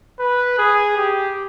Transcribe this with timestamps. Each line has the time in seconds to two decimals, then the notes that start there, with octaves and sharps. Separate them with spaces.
0.19 B4
0.58 G#4
0.97 G4